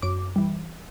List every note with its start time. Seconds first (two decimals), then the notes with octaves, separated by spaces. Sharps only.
0.02 F#2 D6
0.36 E3 G3